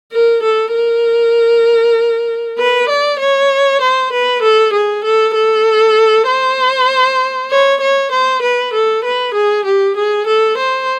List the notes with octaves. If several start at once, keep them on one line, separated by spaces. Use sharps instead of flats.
A#4
A4
A#4
B4
D5
C#5
C5
B4
A4
G#4
A4
A4
C5
C#5
C#5
C5
B4
A4
B4
G#4
G4
G#4
A4
C5